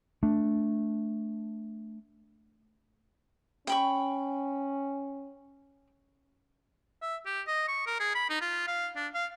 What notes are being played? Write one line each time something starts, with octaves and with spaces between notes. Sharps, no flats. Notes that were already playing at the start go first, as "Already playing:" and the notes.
A3 D4
C#4 G5 B5 C#6
E5
G4
D#5
C#6
A#4
G#4
B5
D#4
F4
F5
D4
F5